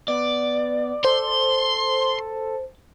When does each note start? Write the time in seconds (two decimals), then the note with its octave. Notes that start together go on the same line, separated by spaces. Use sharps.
0.08 B3 D5
1.05 A4 C5 C6